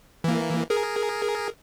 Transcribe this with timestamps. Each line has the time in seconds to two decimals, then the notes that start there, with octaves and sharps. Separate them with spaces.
0.24 E3 A#3
0.70 G#4 A#4